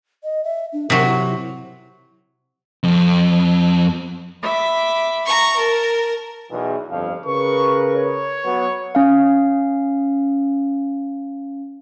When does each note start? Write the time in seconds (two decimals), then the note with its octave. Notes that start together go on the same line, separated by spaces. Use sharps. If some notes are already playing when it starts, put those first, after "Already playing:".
0.24 D#5
0.44 E5
0.73 D4
0.90 C3 F#3 A#4
1.06 E4
2.83 F2
4.42 E5 B5 D6
5.26 A#5 C#6
5.57 A#4 A5
6.50 B1 E2
6.90 G1 F2 F5
7.26 C#3 A#4 B4 C#6
7.95 C#5
8.45 F#3 B3
8.95 C#4 F5